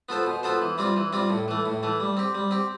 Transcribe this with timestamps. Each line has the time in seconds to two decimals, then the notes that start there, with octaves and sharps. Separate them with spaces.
0.09 B3 F4 A4 C5
0.26 B2
0.43 B3 F4 A4 C5
0.62 E3
0.78 G3 C4 F4
0.96 E3
1.13 G3 C4 F4
1.30 A2
1.48 E3 A3
1.66 A2
1.83 E3 A3
2.00 G3
2.17 C4 G4
2.35 G3
2.51 C4 G4